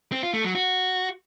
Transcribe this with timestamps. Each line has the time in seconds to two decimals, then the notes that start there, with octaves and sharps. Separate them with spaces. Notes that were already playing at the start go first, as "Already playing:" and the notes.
0.12 C4
0.23 F4
0.34 A3
0.44 F#3
0.55 F#4